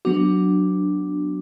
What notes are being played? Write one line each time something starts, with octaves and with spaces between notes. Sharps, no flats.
F#3 B3 D4 F#4